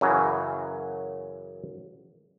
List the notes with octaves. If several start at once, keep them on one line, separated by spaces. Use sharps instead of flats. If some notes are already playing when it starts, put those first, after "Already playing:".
F#2 C#3 E3 F#3